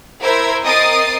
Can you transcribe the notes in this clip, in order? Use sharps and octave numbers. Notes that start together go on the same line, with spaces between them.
E4 A#4 C5 E5 G#6
C4 A#4 D#5 D#6 A6 C7